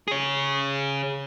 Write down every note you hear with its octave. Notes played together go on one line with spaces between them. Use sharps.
G#4 C#5